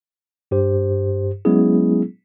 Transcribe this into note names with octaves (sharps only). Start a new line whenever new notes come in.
G2 G4 C5
F#3 G#3 B3 C#4 E4 G#4